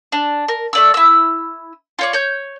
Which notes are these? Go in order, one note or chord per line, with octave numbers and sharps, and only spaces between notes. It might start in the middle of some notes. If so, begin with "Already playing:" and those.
D4
A#4
A3 D5 E6
E4 E6
F4 C#5 D5
C#5 G6